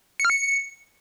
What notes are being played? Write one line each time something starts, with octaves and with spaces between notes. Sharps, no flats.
C#7
F6
C#7